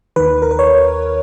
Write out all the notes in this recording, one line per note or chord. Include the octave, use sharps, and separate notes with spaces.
D#2 D#3 B4
A#4
B4
C#5